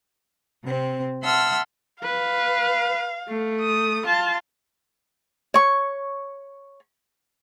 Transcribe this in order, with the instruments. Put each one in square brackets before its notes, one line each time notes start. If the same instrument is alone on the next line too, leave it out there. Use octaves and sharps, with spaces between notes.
[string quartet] C3 C4
E5 F#5 A5 C6 E6 F6
[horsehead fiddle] B4 [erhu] F5
[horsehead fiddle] A3
[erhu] D#6
[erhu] F4 [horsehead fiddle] A5
[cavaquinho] C#5 C#6